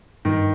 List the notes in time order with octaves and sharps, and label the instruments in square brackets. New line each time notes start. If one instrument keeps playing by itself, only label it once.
[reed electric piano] G2 [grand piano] D#3